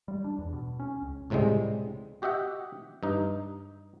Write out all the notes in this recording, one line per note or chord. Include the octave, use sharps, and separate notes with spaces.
G3
D4
E2
B2
C#4
C#2
C#2 A2 C3 G3 G#3
F#4 G4 D#5 E5 F#5
G2 D#4